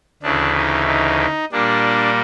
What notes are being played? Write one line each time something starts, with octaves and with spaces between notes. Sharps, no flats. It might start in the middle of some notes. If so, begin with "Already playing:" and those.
D2 C#3 E3 D4
D#4
D#4
A#2 G3 A#3 D4